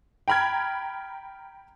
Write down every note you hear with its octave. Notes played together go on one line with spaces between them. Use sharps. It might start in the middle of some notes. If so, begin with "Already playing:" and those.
G5 A#5 B5 F6 G#6